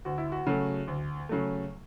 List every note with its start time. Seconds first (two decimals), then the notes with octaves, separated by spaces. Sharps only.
0.05 D2 F#4
0.18 E4
0.32 F#4
0.47 C#3 F#3 A3
0.88 D2
1.29 C#3 F#3 A3